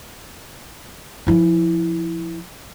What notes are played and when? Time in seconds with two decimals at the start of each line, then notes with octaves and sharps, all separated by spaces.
1.27 F3 E4